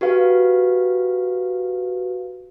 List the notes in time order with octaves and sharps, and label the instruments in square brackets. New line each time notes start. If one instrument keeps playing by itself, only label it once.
[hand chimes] F#4 G4 B4 F5